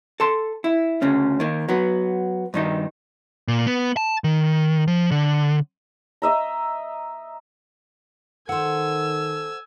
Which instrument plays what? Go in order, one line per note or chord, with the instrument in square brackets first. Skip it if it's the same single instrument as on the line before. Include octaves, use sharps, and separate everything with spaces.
[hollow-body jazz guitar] A4 A5 C6
E4
D2 C#3 C#4
D#3 A#3
F#3 B3
G2 D#3 D#4
[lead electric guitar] A#2
B3
A5
D#3
F3
D3
[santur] D#5 E5 A#5
[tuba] D#3 [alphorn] A4 [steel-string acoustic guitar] C5 F#5 [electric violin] G#5 E6